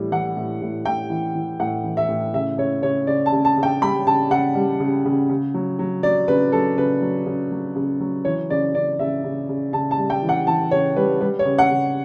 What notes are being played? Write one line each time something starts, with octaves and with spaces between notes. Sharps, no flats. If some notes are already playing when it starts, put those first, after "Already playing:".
Already playing: A2 E3 G3
E3 F#5
A2
A2
A2 G5
E3
E3
A2 F#5
E3
E5
A2
C#3 E5
C#3 C#5
C#3 C#5
C#3 D5
A5
C#3
A5
C#3
G5
G3 B5
C#3 A5
C#3 F#5
G3
C#3
C#3
C#3
F#3
F#3
F#3 D5
C#3 B4
F#3 A4
C#3 B4
F#3
C#3
F#3
C#3
F#3
E3 C#5
C#3 D5
C#3 D5
C#3 E5
C#3
C#3
C#3 A5
A5
G3
G5
E3
F#5
E3 A5
C#3 C#5
G3 B4
G3 B4
C#5
C#3
F#5
C#3